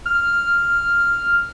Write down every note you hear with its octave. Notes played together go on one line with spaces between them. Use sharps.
F6